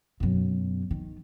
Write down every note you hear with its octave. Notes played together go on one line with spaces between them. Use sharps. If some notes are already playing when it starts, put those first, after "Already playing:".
F#2 B2
D#3